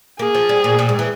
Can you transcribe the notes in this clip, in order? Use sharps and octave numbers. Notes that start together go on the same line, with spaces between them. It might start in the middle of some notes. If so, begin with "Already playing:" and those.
A#3 G#4
F3
G3
A#2
A#2
G#2
E3